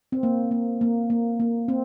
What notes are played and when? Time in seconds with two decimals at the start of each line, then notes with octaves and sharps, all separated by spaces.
0.12 C4
0.23 A#3
0.51 A#3
0.81 A#3
1.10 A#3
1.40 A#3
1.68 C4